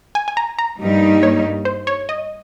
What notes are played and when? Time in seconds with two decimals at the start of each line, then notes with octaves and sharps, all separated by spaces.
0.15 G#5
0.28 G#5
0.37 A#5
0.59 A#5
0.80 G2 G3 A#3 D#4
1.23 C#5
1.65 C5
1.87 C#5
2.09 D#5